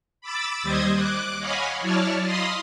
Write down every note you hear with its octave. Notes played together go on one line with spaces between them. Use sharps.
B5 D6 E6 A6
D#2 G3 C5 D#5 D#6 G#6
D6 F#6
C#5 D#5 F5 F#5 G#5 B5
F#3 E4 C#5 D5 A5 F6
D#5 F5 B5 C6 D#6